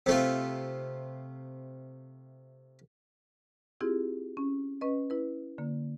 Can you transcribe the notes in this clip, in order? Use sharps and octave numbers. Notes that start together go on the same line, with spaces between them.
C3 A3 F4
C4 E4 F4 G4 G#4
C#4
C#4 B4 D#5
E4 B4
D3 A#3